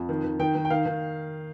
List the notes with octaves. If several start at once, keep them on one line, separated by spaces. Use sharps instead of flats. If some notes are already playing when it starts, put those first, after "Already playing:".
Already playing: F2
D#3
D#3
D#3 G5
D#3
G5
D#3 F5
D#3